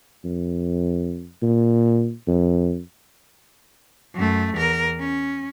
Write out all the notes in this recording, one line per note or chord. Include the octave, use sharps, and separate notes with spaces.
F2
A#2
F2
F#2 A3
E2 A#4
C#4